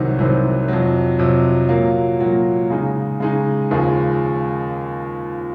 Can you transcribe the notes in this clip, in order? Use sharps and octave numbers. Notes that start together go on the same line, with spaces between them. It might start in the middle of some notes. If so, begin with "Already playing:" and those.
Already playing: C2 C3 D#3 F#3 C4
C2 C3 D#3 F#3 C4
F2 C3 F#3
F2 C3 F#3
A#2 F#3 A#3
A#2 F#3 A#3
C#3 G#3 D#4
C#3 G#3 D#4
D#2 C#3 F3 G#3